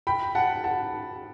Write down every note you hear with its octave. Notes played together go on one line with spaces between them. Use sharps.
G5 B5
F#5 A5
F#5 A5